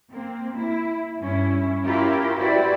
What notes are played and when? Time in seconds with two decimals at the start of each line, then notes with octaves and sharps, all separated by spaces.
0.12 A#3 C4
0.57 E4
1.20 G2 C#4 E4
1.84 C#4 E4 F4 G4 A#4
2.38 E4 F#4 G4 B4 C5 D5